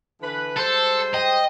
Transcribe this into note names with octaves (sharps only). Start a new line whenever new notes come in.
D3 E3 B4
G#2 G3 A4 C5
D#5 G5